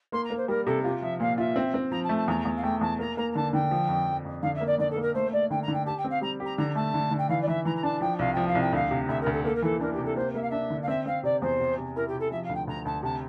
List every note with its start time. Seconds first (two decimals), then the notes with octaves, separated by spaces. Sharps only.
0.12 A#3 C6
0.24 A#5
0.30 A#3
0.37 C5
0.48 G3 A#4
0.66 C3 A4
0.84 F4 G4
1.02 F3 E5
1.20 A#2 F5
1.38 F4 E5
1.56 C4
1.74 C4
1.91 F3 A#5
2.04 A5
2.09 A3
2.16 A5
2.28 E2 A#5
2.39 A#5
2.45 E2
2.57 F5
2.63 A3 G5
2.81 E2 A5
2.99 A#3 A#5
3.17 A#3 A#5
3.32 A#5
3.35 D3 A5
3.53 D3 G5
3.71 F3
3.88 F2
4.07 F3
4.25 F2
4.42 D3 F5
4.55 E5
4.61 A#3
4.66 D5
4.78 D3 D5
4.90 A4
4.96 A#3
5.02 A#4
5.14 A3 C5
5.32 A3 D5
5.50 D3 G5
5.62 A#5
5.68 D3
5.73 G5
5.86 G4 A5
5.97 G5
6.04 C4
6.10 F5
6.21 G3 A#5
6.40 G4
6.45 A#5
6.57 D3 A#5
6.75 A3 A5
6.94 D3
7.11 D3
7.18 G5
7.29 E3 F5
7.42 D5
7.47 E3 E5
7.65 E3 A#5
7.76 A#5
7.83 D4 A5
8.01 F3 G5
8.19 C2 F5
8.33 F3 G5
8.47 F5
8.55 C2
8.61 G5
8.72 D2 F5
8.91 C3
9.09 D2 E5
9.21 A#4
9.26 D2
9.32 A4
9.44 A#3 A4
9.55 A#4
9.62 E3 A4
9.81 D4 A#4
9.93 G4
9.99 C3
10.05 A4
10.16 A#3 C5
10.34 A#3 E5
10.42 F5
10.49 D4 E5
10.70 D3
10.82 F5
10.88 C4 E5
11.06 C4 F5
11.23 C3 D5
11.41 E2 C5
11.60 C3
11.78 C3
11.96 E4 A#4
12.08 G4
12.13 C3
12.20 A4
12.31 F3 E5
12.44 F5
12.49 D2
12.55 G5
12.67 D2 A#5
12.85 D2 A5
13.03 C3 A5